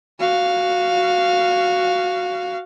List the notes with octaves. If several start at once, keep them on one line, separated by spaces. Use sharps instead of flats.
F#4 F5